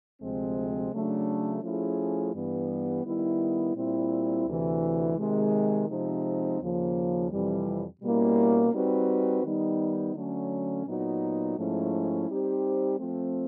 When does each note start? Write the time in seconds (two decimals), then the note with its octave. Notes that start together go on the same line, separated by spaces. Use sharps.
0.21 D2 C3 F3 G#3 C4
0.92 C#3 F#3 A3 D4
1.63 F3 A3 C#4 E4 G#4
2.34 G2 E3 G3 B3
3.04 D#3 G3 B3 E4
3.75 A#2 G3 C4 E4
4.46 D2 C3 E3
5.17 C3 D#3 G#3
5.89 C3 F3 G#3 C4 D#4
6.60 D#2 C#3 F3 A#3
7.30 F2 C3 E3 G3
8.01 B2 G3 A#3 C#4 E4
8.72 G3 C4 D#4 F#4 B4
9.43 D#3 G3 B3 D#4
10.14 D3 F#3 A3 C#4
10.86 A#2 F#3 B3 D#4 F#4
11.57 G#2 F3 A3 C#4 E4
12.28 G3 C4 D#4 G4 C5
12.98 F3 A3 C4